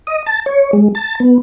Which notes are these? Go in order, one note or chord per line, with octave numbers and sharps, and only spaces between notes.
D#5
A5
C#5
G#3
A5
B3